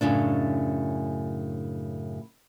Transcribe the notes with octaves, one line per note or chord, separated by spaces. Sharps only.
F#2 A2 C#3 D4